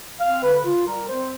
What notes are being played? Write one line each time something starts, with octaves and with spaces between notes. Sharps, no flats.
C4 F5
D3 B4
F4
G3 A#4
C4 C5